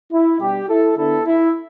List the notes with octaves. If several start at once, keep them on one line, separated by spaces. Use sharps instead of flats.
E4
B2 G3 D4 G4
E4 A4
D3 B3 D4 E4 A4
E4